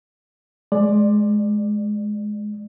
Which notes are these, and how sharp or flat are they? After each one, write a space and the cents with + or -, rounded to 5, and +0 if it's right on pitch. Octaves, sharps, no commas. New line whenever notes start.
G#3 +15 D5 +15